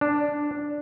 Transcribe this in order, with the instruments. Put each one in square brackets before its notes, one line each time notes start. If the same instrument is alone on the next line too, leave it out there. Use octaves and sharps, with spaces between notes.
[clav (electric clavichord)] D4